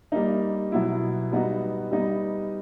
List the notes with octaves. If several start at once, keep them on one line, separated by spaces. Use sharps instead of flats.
G3 A#3 D#4
B2 F#3 B3 E4
G3 B3 D#4 F#4
G3 B3 D#4